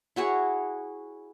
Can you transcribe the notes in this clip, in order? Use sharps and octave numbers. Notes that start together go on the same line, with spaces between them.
E4 F#4 G#4 C#5